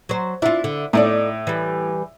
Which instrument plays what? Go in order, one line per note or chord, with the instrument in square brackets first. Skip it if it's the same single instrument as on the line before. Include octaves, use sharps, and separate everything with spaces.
[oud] F#3 C5
[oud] D4 F4 [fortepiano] E4
[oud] D3
[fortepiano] A2 [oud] D#4 A4 D5
[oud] E3 G3